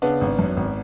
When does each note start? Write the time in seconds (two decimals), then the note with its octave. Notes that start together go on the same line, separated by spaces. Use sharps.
0.02 C#3 B3 D4
0.21 G#1
0.39 F#2
0.57 G#1